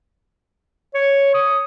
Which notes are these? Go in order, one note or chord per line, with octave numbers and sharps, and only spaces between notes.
C#5
D#6